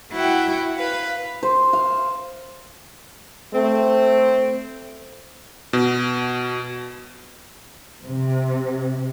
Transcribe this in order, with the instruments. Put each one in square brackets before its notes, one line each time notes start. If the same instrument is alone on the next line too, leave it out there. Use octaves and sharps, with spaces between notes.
[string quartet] E4 F#4 F#5 G5
B4 F5
[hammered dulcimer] C5
F5
[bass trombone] A3 [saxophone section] C4
[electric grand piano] B2
[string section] C3